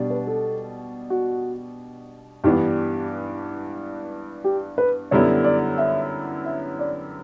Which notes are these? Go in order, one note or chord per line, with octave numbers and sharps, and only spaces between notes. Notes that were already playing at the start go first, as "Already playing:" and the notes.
Already playing: B2 G3 D4
B4
A4
F#4
G2 E3 B3 D4 G4
G4
B4
F#2 D3 G3 B3 E4 C#5
D5
E5
E5
D5